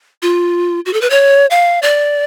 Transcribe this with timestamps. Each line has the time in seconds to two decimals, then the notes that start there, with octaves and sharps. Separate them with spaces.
0.22 F4
0.86 F#4
0.93 A4
1.01 B4
1.10 C#5
1.50 F5
1.82 D5